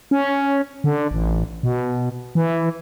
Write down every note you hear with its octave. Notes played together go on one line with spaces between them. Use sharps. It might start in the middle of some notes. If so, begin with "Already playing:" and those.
C#4
D3
A1
B2
E3